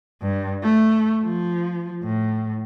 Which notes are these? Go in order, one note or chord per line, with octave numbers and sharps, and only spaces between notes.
G2
A3
F3
A2